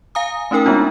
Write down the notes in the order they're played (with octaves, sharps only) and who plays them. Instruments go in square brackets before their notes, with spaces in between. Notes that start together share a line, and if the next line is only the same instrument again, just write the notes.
[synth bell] F5 G#5 A#5 D#6
A3 C#4 D#4 A#4 G5
G#3 B3 D4 D#4 F4